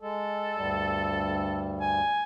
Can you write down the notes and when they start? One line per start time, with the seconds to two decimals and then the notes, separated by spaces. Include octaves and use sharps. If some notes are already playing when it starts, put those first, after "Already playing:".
0.01 G#3 A4
0.58 D2 G2 G3
1.81 G#5